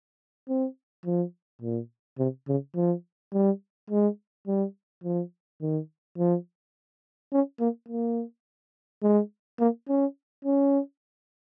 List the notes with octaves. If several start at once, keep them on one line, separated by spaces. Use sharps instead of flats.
C4
F3
A#2
C3
C#3
F3
G3
G#3
G3
F3
D#3
F3
C#4
A#3
A#3
G#3
A#3
C#4
C#4